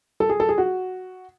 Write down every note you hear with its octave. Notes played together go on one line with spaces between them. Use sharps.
A4
G#4
A4
G#4
F#4